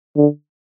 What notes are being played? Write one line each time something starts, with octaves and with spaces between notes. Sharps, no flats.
D3